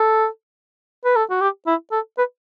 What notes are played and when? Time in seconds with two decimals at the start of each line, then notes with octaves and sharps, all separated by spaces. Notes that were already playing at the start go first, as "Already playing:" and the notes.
Already playing: A4
1.05 B4
1.16 A4
1.30 F#4
1.41 G4
1.67 E4
1.92 A4
2.18 B4